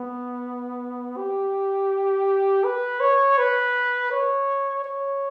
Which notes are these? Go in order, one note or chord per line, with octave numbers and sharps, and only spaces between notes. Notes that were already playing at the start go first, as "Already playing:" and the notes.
Already playing: B3
G4
B4
C#5
B4
C#5
C#5